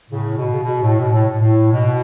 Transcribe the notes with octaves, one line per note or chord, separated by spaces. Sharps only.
A2 C#3
B2
C#3
B2
A2
B2
A2
A2
B2